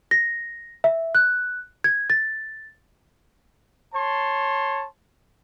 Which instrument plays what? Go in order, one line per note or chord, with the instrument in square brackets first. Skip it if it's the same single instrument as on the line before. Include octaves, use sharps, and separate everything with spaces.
[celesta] A#6
E5
F#6
G#6
A6
[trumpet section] C#5 A5 C6